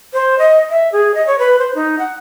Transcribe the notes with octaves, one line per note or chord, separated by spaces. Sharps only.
C5
D#5
E5
G#4
D#5
C#5
B4
C5
D#4
F#5